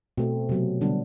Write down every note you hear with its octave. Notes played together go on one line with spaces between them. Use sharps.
B2 A3 C4
C3 F#3 B3
D3 G3 B3 D4